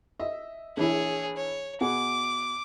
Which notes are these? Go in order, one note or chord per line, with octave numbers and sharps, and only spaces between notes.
D#5 E5
A#1 E3 E4 G#4 C#5
C#5
B2 F#4 G#4 D6